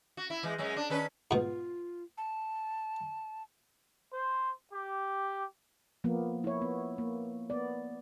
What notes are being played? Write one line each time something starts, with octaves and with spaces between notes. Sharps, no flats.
F#4
E4
E3 G#3
F#2 G#3 C#4
D4
D#3 C#4 B4
G#2 B2 F4
A5
C5
G4
F3 A#3 B3
E4 C#5
B3
A#3
B3 D5